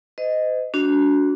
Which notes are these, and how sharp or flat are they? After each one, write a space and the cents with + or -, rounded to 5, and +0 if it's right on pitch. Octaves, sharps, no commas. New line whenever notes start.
C5 -40 D#5 +0
D4 -25 F#4 +0